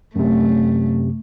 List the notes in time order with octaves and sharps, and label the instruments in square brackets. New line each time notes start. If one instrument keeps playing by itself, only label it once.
[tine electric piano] F#2 C3 [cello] A3